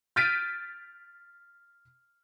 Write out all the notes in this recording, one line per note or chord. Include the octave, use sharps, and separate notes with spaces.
F6 G6 A6 B6 D7 D#7